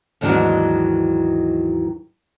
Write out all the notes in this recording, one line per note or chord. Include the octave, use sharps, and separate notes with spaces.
D#2 G#2 D#3 E3 F#3 D4